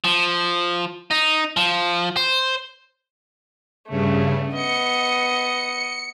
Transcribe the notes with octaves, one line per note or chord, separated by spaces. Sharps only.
F3
D#4
F3
C5
G2 C#3 A3
B3 D#5 C#7